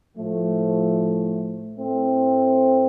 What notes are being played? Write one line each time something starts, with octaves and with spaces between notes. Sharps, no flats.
A2 F3 A3
A2 A3 C4